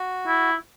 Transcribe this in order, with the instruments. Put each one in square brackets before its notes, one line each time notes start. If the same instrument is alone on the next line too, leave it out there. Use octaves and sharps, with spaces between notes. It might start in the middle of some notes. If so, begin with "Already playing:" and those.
Already playing: [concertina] F#4
[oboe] E4